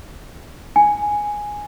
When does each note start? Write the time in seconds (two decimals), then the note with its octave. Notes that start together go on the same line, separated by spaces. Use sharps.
0.76 G#5